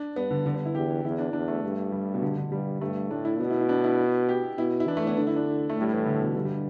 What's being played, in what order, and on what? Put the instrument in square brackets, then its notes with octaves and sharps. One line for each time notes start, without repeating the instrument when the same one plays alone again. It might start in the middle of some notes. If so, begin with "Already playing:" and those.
Already playing: [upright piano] D4
[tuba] G2 [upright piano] B3
[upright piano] D3
D3
B3
E4
[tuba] E2 [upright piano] G4
[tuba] E2 [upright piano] E4
[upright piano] D4
[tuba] E2 [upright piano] D4
[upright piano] A3
[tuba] G2
[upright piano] G3
B2
D3
D3
[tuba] G2 [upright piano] G3
[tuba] G2 [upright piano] A3
[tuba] A2 [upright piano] D4
[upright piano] E4
[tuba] B2 [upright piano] B3
[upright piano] E4
E4
D4
E4
G4
[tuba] B2 [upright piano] E4
[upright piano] E4
[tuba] E3 [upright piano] D4
[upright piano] A3
B3
[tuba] D3 [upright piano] D4
[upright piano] E4
D4
A3
[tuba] A2
[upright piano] G3
E3
D3
B2
[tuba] G2 [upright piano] D3
[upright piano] G3